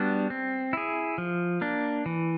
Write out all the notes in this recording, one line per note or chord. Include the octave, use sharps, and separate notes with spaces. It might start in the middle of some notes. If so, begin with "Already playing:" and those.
Already playing: G3 B3 D4 F#4
C4
E4 G#4
F3
A#3 D4
E3